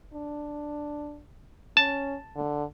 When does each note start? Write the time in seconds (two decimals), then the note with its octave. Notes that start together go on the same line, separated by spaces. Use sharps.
0.14 D4
1.77 C#4 A5
2.36 D3